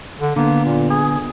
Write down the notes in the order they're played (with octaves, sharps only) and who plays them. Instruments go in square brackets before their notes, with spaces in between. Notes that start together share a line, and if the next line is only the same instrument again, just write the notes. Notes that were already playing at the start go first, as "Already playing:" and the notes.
[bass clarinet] D3
[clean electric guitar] D3 B3 [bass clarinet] A#3
[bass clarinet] A#2
G#4